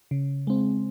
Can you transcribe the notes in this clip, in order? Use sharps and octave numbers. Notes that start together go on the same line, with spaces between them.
C#3
G#3 C4